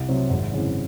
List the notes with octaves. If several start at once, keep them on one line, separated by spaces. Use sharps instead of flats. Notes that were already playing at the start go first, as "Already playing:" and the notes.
Already playing: C2
C3 F#3 C4
G#1
F#2 C#3 E3 C4